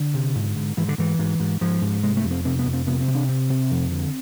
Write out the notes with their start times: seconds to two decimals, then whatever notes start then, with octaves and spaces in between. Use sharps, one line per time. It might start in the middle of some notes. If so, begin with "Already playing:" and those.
Already playing: D3
0.14 C3
0.35 G#2
0.56 G#2
0.77 G#2 E3
0.89 D3
0.98 G#2 E3
1.19 G#2
1.40 G#2
1.61 G#2 F3
1.82 G#2
2.03 C3 G#3
2.17 A3
2.24 F2
2.31 C4
2.45 C3 C4
2.59 B3
2.66 F2
2.73 C4
2.87 C3 B3
3.01 C4
3.08 C3
3.15 D4
3.29 C3 C4
3.50 C3
3.71 F2
3.92 D3